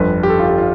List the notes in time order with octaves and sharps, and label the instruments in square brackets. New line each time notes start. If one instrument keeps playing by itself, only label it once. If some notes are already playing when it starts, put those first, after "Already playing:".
Already playing: [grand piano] G1 F2 D3 B4
G4
A4
F4
G4
F4